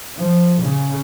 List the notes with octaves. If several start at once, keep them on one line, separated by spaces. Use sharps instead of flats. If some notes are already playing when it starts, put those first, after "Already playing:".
F3
C#3